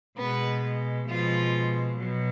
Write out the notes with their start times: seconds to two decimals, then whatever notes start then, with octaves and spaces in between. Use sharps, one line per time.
0.18 B2 G#3 B3 B4
1.09 B2 F3 G#3 F4
1.98 B2 F#3